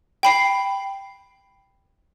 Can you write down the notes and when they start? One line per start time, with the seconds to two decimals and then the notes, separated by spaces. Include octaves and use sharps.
0.23 G5 B5 C7